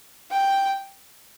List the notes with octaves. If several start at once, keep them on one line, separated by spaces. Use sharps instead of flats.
G5